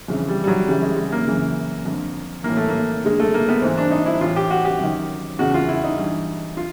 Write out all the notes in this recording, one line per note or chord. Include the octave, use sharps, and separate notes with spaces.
F2 C#3 E3
G3
G3
F#3
F#2 C#3 E3 G3
G#3
G#3
A#3
F#2 C#3 E3
F2 D3
A2 E3 A#3
A3
A#3
G2 D3 G#3
A3
A#3
B3
G#2 E3 C4
D4
D#4
E4
A2 E3 F4
G4
F#4
G4
F#2 D#3
E2 C#3 E3 F#4
F4
E4
D#4
G2 E3
F4